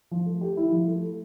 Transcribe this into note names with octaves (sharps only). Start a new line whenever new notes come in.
F3
A3
G4
E4
F3
A3